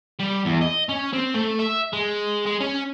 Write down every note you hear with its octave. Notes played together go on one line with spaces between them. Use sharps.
G3
E2
D#5
C#4
C4
A3
E5
G#3
G#3
C#4